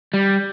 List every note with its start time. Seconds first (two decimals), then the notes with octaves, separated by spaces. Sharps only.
0.14 G3